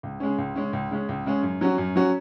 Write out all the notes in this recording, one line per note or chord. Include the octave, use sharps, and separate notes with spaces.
C#2
C#3 G#3 C#4
C#2
C#3 G#3 C#4
C#2
C#3 G#3 C#4
C#2
C#3 G#3 C#4
F#2
F#3 C#4 F#4
F#2
F#3 C#4 F#4